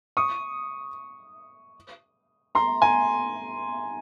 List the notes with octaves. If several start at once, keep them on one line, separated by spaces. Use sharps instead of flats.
C#6 D#6
A#5 C6
G#5 A#5